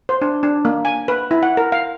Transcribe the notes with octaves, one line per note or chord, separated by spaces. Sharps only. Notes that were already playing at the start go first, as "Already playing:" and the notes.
C5
D4
D4
A#3
G#5
B4
E4
F#5
A#4
F5